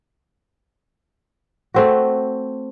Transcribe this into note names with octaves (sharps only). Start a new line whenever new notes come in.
A3 C4 F#4